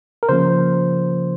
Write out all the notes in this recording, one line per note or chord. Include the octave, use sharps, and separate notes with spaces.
A#4
C#3 F3 A#3 C5